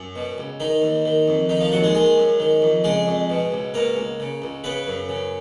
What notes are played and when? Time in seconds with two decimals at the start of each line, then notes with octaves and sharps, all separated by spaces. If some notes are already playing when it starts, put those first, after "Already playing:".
Already playing: F#2
0.16 B2
0.38 C#2
0.60 D#3 D#4
0.82 D#2
1.05 D#3
1.28 F2
1.49 D#3 D#4
1.61 F3 F4
1.72 D#2 F#3 F#4
1.83 G#3 G#4
1.95 D#3 G#3 G#4
2.18 F#2
2.40 D#3
2.62 F2
2.84 C#3 G#3 G#4
3.07 F2
3.30 B2
3.52 C#2
3.74 B2 A#3 A#4
3.97 C#2
4.20 C#3
4.42 C#2
4.64 C#3 B3 B4
4.87 F#2
5.09 C#3